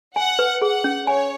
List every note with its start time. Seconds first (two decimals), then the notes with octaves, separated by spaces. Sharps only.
0.16 F#5 G#5
0.39 B4
0.62 G#4 F#5
0.84 C#4
1.06 C#5 G#5